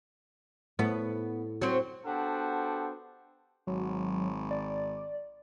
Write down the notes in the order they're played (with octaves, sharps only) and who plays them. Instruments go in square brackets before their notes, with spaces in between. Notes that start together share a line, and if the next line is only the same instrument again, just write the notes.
[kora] A2 [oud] B3
[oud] F#3 C4
[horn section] B3 D4 F#4 G4 A4 C5
[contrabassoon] G#1 [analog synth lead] F#3
[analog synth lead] D5